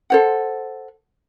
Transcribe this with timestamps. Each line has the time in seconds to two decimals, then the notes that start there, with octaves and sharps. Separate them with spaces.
0.10 A4 C5 F#5